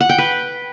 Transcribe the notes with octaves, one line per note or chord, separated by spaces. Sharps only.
F#5
G5
B4